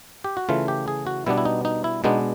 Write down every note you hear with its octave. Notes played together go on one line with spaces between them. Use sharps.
G4
F#4
C#3 E3 A3 F4
G4
G#4
F#4
B2 G3 B3 D4 E4
E4
D#4
D#4
E4
B2 G#3 B3 D4 D#4